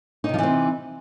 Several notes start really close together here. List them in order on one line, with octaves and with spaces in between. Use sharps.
D#4 C3 F3 E3 C4